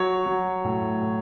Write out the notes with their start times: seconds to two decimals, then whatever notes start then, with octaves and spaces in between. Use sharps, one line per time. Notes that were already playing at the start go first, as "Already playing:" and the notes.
Already playing: F#3 C#5
0.26 F#3
0.64 A2
1.02 A2